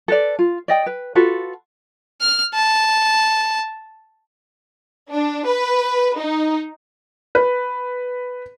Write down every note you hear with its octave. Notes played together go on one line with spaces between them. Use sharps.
A4 B4 D5
F4
D5 D#5 G5
B4
F4 F#4 A4 B4
F6
A5
D4
B4
D#4
B4